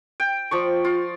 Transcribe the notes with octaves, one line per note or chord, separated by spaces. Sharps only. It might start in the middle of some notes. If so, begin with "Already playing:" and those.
G5
F3 D5 C#6
F4